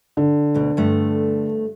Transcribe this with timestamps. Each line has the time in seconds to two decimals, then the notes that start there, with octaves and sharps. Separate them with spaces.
0.17 D3
0.54 D2 B2
0.77 G2 A3